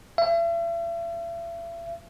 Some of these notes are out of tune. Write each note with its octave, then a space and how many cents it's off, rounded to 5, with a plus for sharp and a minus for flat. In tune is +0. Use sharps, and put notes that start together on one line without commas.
E5 +40